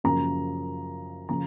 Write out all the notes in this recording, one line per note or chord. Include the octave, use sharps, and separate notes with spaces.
F#2 C#3 F3 A#3 A#5
C#3 F3 A#5